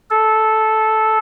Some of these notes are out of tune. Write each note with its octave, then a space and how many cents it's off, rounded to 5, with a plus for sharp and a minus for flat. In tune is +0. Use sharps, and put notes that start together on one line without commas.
A4 -10